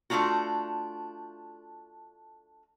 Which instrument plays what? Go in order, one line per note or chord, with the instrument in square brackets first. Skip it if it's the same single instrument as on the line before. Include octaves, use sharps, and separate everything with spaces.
[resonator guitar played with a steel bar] A3 C4 D4 F4 F#4